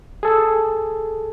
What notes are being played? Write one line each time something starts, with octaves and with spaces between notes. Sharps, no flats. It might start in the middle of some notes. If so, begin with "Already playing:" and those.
G#4 A4